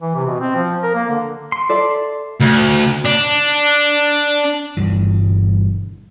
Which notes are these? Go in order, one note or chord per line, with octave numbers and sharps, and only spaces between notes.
E3
C3
B2
C4
F3
A#4
A#3
D3
C6
A4 D5 E5
D2
D4
G1 G2 B2 E3